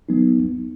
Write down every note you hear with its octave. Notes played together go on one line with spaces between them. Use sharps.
F#3 B3 D#4